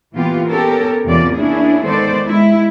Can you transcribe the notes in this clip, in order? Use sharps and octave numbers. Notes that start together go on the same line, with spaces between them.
A#2 E3 B3 F4 G4
B3 C#4 G4 A4 A#4
E2 C3 A#3 C#4 F4 D5
A#3 C#4 D4 E4 G#4
D#3 G#3 B3 A4 C5 D5
G#3 E4